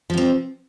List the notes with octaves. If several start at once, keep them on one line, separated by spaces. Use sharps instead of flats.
C3 F3 C4